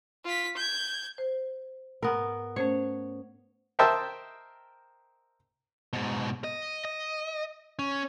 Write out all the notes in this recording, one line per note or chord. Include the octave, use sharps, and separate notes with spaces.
F4 B6
G6 G#6
C5
G#2 B3 A#4
A3 C#4 C5 C#5
A#4 C5 D#5 E5 G5 A5
G#2 B2
D#5
D#5
C#4